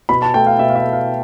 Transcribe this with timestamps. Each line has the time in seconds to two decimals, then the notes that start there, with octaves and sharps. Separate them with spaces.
0.09 B2 B5
0.22 A5
0.34 A3 G5
0.47 F5
0.59 B2 E5
0.70 F5
0.75 E5
0.84 A3
0.93 F5